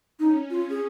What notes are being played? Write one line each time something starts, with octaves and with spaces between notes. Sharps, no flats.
C#4 D#4
F4
G#4